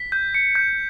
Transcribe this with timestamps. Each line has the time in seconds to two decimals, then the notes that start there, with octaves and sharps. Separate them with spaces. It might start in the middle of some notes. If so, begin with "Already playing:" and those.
Already playing: B6
0.12 G6
0.34 C#7
0.55 G6